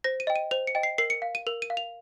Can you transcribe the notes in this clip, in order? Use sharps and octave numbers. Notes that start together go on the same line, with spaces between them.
C5 A#6
D#7
D#5 G5
D#7
C5 F7
C#7
D#5 G5
C7
A#4 C7
C#7
F5
D#7
A#4 F7
D#7
F5
F7